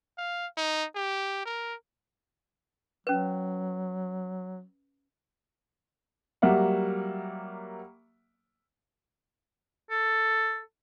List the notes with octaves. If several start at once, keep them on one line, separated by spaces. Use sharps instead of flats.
F5
D#4
G4
A#4
F#3 C#4 B4
F#3 G3 A#3 E5 F#5
A4